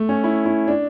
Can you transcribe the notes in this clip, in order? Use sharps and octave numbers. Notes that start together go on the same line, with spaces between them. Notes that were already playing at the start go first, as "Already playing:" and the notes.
Already playing: A3
C#4
E4
E4
D4